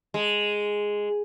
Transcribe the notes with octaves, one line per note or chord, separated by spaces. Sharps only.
G#3